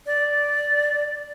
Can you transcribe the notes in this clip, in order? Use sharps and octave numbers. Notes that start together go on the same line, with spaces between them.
D5